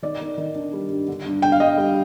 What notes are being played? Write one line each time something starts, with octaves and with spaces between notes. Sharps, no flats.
D#3 D5
D#3
D#3
D4
G3
G2
D3
G2
D3 G5
F5
G2 D#5
G3